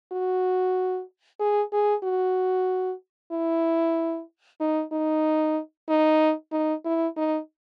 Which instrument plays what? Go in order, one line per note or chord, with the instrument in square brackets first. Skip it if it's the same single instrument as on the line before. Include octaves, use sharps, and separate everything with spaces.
[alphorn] F#4
G#4
G#4
F#4
E4
D#4
D#4
D#4
D#4
E4
D#4